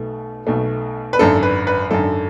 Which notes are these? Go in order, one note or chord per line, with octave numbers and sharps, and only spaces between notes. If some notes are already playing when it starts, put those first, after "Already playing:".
Already playing: B1 B2 A3
B1 B2 A3
B4
G#1 F#2 D3 A4
B4
B4
G#1 F#2 D3 A4